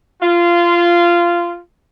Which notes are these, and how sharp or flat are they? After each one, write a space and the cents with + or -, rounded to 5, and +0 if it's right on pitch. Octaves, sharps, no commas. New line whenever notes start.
F4 -15